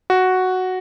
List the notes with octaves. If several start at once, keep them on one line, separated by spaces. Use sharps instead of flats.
F#4